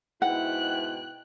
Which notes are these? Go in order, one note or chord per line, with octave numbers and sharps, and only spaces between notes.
G#2 B2 E4 F#5 G5 F#6